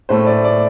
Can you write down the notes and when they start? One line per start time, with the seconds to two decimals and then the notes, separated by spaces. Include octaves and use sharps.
0.09 A2 A3 C5
0.26 D5
0.44 D5